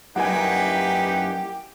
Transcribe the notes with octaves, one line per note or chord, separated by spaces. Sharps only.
F#2 D#4 E4 G4 A#4 B4 F#5 G#5